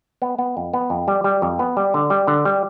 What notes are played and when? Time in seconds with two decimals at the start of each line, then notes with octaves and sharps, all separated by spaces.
0.22 B3
0.39 B3
0.57 F2
0.73 B3
0.90 F2
1.08 G3
1.24 G3
1.42 F2
1.59 B3
1.77 G3
1.94 D3
2.10 G3
2.27 D3
2.45 G3